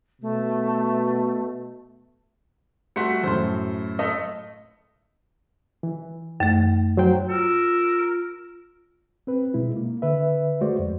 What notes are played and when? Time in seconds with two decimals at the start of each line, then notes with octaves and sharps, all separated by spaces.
0.21 B2 A3
2.96 G3 A3 F#4 C6 B6 C#7
3.23 F#2 A2 C5 C6
3.99 A3 A4 D#5
5.83 E3
6.40 F#2 A3
6.97 F#3 C5 G5
7.29 F4 A#4 E6
9.27 C4 B4
9.54 B2 G#3 E4
9.76 A#3
10.02 D3 B4 E5
10.61 G#3 A3 F#4 C5 D5
10.79 F2